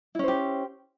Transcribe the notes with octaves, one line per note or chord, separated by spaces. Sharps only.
C#4 E4 G4 C5